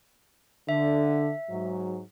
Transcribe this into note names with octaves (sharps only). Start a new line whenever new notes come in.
D3 E5
G#2 F#3